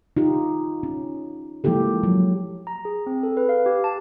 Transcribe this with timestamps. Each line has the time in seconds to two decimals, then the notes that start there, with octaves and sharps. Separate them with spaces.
0.17 D#4 F4 G4
0.83 C#4
1.64 F3 G#3 A#3 E4 G4 A4
2.03 F#3
2.67 A#5
2.85 G#4
3.06 C4
3.23 A4
3.37 B4
3.49 F5
3.66 G4
3.84 A5